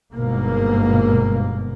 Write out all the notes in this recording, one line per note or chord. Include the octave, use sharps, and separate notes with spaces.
G1 G#2 B2 A#3